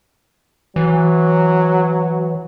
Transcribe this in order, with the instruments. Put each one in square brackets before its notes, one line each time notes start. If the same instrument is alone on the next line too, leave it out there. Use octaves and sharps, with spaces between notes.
[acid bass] E3 [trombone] F#3